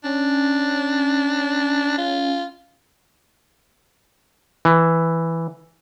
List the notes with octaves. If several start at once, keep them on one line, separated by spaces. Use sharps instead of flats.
C#4 D4
F4
E3